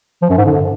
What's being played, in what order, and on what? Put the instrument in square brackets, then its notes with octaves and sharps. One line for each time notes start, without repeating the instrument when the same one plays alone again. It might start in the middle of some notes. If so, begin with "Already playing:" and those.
[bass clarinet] F3
F#2
G#2
D3